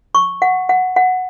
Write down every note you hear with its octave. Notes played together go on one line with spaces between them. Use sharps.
C#6
F#5
F#5
F#5